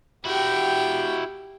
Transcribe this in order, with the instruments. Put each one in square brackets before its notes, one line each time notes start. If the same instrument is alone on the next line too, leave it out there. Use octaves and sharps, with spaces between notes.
[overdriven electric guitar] E4 F#4 [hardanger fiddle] G4 G5